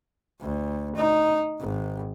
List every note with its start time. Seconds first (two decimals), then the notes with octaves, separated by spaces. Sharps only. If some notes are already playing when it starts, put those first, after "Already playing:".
0.41 D2
0.96 D#4
1.60 G#1